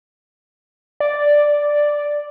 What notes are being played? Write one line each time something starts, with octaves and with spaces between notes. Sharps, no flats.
D5